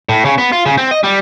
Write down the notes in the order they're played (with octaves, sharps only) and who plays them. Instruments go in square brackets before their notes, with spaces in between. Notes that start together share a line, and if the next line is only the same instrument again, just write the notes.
[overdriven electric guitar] A2
C#3
B3
F4
C#3
C4
D#5
G3